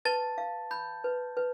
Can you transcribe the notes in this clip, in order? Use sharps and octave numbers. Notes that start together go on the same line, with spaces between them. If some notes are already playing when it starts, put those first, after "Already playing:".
B4 A5 A6
F5
B5 G6
B4
B4